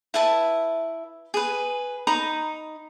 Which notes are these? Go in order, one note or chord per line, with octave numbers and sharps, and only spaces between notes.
E4 B4 E5 A5
G#4 B4
D#4 A#5 B5 D#6